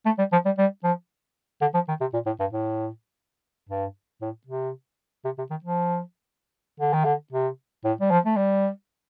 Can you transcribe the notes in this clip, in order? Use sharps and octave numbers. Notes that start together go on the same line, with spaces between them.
A3
G3
F3
G3
G3
F3
D3
F3
D#3
C3
A#2
A2
G2
A2
G2
A2
C3
C3
C3
D#3
F3
D3
D#3
D3
C3
A2
G3
F3
A3
G3